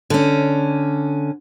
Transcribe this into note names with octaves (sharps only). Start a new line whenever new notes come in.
D3 C#4